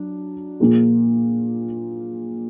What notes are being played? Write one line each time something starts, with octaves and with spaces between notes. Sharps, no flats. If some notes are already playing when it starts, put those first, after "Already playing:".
Already playing: F#3 D4
A#2 F3 A#3 F4 G#4